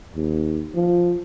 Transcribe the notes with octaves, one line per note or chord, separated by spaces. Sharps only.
D#2
F3